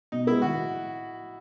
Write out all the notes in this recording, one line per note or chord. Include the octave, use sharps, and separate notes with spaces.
B2 D#4
G#3 B3 E4
D#3 F#4